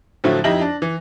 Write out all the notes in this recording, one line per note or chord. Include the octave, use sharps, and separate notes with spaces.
A2 D3 F3 F#3 A3 E4
F2 D#4 E4 G4 A#6 F#7
D4
E3